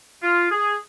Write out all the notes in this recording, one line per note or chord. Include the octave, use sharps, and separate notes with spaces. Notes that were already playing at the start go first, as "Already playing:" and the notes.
F4
G#4